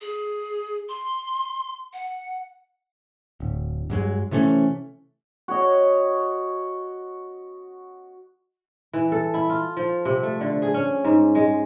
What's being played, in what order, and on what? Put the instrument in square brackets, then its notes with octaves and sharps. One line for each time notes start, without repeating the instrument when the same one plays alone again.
[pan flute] G#4
C6
F#5
[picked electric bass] D1
G2 F#3 G#3
C3 E3 A3 C#4
[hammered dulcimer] F#4 C#5 D#5
[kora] E3
A4
E4
F4
F3
C3
A3
D3
G#4
C#4
G#2
G#3